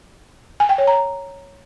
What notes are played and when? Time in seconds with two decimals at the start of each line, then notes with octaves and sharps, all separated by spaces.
0.60 G#5
0.69 G5
0.78 C#5
0.87 A#5